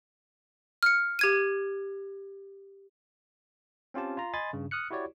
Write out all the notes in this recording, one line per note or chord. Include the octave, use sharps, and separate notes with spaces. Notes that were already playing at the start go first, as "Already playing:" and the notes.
F6 C#7
G4 G#6 D#7
C4 C#4 F4 G4 A5
F4 A#5
D#5 G#5 B5 C6 A6
G2 C#3
D#6 F6 F#6 C#7
E4 F#4 G4 C#5 D5